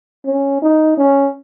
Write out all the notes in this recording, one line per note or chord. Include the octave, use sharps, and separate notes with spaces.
C#4
D#4
C#4